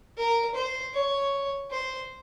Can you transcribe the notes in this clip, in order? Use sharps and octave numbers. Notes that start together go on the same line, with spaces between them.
A#4
C5
C#5
C5